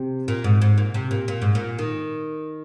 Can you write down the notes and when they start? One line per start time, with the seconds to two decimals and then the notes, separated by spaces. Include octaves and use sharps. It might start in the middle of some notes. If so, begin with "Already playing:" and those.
Already playing: C3
0.28 A#2
0.44 G#2
0.62 G#2
0.78 A#2
0.94 C3
1.11 A#2
1.28 A#2
1.42 G#2
1.55 A#2
1.79 D#3